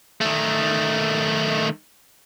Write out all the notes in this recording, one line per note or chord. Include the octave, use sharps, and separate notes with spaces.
D#3 A3